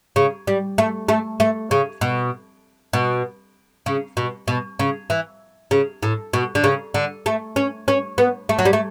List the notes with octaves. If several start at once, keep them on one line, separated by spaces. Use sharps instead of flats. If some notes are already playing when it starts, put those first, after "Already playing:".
C#3
G3
A3
A3
A3
C#3
B2
B2
C#3
B2
B2
C#3
E3
C#3
A2
B2
D3
C#3
D3
A3
C#4
C#4
B3
A3
F#3
G3
A3